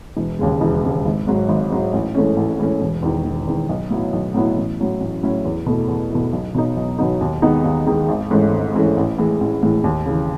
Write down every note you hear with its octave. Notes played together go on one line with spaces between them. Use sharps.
E1
D#2 C#3 G#3
E1
D#2 C#3 G#3
G#1
G#2 F#3
G#1
G#2 F#3
A1
G#2 E3 A3 C#4
A1
G#2 E3 A3 C#4
E1
E2 D#3
E1
E2 D#3
B1
A2 F#3 B3 E4
B1
A2 F#3 B3 E4
A1
A2 F#3 C#4 E4
A1
A2 F#3 C#4 E4
E2
B2 A3 E4
E2
B2 A3 E4
B1
B2 F#3 B3 D#4
B1
B2 F#3 B3 D#4
D#2
D#3 G#3 B3 D#4
D#2
D#3 G#3 B3 D#4
G#1
G#2 E3 A3 C#4
G#1
G#2 E3 A3 C#4
A1
A2 E3 G#3
A1
A2 E3 G#3
D#2
C#3 E3